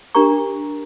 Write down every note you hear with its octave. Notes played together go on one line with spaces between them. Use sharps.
D4 G4 A#4 A#5 C#6